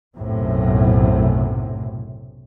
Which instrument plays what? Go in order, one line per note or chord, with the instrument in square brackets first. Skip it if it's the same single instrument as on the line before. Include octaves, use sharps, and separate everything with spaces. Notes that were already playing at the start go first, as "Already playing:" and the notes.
[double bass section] B1 F#2 A2 C3